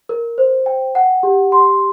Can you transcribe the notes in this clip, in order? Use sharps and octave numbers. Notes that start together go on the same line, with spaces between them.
A#4
C5
G5
F#5
G4
C6